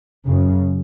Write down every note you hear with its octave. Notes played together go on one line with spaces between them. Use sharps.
F#2 C#3